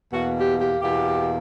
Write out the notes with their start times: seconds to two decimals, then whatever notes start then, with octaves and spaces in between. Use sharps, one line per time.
0.12 E2 B2 A#3 F#4
0.36 G4
0.59 G4
0.82 E2 B2 A#3 G4